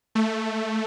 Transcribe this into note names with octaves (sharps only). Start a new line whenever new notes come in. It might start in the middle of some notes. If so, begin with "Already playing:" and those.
A3